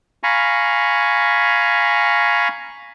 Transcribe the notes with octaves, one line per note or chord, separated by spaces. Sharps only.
F5 G#5 A#5 B5 C#6